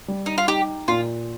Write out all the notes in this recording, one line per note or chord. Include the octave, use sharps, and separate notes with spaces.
G3
D#4
F4
D#4 G4
A#2 F4